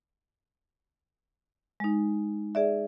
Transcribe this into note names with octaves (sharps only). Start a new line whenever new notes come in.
G#3 D#4
G#4 D5 E5